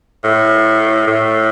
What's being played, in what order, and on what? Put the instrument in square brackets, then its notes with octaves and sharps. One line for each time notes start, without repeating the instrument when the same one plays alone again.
[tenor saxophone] A2
A2